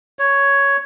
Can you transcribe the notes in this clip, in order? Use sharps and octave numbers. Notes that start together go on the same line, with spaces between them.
C#5